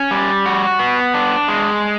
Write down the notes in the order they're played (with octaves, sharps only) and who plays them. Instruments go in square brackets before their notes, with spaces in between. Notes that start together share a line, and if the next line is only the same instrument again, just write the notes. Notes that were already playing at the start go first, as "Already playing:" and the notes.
Already playing: [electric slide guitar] C#4
G3
F#4
B3
D4
G#3